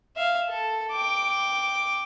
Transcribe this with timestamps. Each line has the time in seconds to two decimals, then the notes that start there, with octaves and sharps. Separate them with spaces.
0.17 E5 F5
0.49 A4
0.91 G5 D6